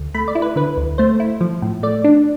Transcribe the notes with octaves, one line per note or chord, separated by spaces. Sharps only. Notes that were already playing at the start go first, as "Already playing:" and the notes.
Already playing: D2
A3 B5
D5
E4
B4
D3 B4
D2
A3 C5
E4
F3
A2
A3 D5
D4